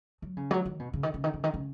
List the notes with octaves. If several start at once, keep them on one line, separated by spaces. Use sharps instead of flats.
F#3
C#3
F#3
D#3
B2
C#3
D#3
C#3
D#3
C#3
D#3
C#3